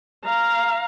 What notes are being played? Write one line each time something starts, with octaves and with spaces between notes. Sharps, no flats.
F5 A#5